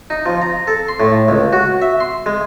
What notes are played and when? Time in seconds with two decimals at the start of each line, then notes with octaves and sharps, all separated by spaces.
0.10 D#4
0.26 F3
0.42 A#5
0.67 A4
0.88 C6
1.00 A2
1.29 C#2
1.53 F#4
1.82 E5
2.00 C6
2.26 G#3